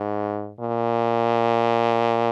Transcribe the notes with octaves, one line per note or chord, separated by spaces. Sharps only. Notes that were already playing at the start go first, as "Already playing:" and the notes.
Already playing: G#2
A#2